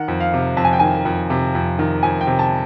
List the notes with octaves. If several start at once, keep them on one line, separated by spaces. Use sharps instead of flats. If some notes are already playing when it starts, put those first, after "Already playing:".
Already playing: D#3 F#5
F2
F5
C3
F2 A5
G#5
G5
D#3 G#5
F2
C3
F2
D#3
F2 G#5
G5
C3
A5